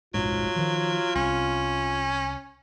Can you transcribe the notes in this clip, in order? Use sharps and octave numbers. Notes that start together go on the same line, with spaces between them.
F1 A#1 G#2 F#3 F4
D#3 F3
C2 C#4